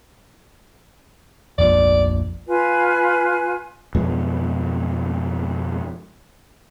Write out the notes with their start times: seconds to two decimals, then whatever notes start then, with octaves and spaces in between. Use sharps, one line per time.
1.58 F1 A#1 A#2 D5
2.48 F4 B4 G#5
3.95 F2 B2 G#3